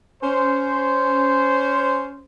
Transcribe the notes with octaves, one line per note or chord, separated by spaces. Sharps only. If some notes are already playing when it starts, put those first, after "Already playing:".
C#4 C5